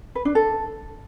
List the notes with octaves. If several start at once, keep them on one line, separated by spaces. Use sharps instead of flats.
B4
D4
A4